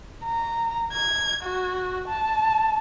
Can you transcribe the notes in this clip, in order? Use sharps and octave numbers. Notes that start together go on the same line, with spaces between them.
A#5
G#6
F#4
A5